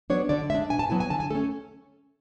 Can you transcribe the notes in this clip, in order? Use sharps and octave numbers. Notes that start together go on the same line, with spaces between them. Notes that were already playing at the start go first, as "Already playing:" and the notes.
F#3 B3 D4 C#5
D3 D5
G#3 D4 E5
B2 G#5
A5
F#3 B3 E4 G#5
G#5
D3 A5
G#5
A3 C#4 A4